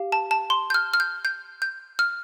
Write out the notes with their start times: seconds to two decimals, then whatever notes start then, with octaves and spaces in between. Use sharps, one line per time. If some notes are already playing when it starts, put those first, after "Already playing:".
Already playing: G4 F5
0.12 A5
0.31 A5
0.50 C6
0.70 G6
0.74 F6
0.94 F6
1.00 G6
1.25 G6
1.62 G6
1.99 F6